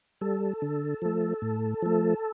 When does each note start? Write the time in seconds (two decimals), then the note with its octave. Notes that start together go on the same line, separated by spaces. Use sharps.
0.21 G3 A4
0.62 D3
1.02 F3 A3
1.42 A2
1.82 F3 A3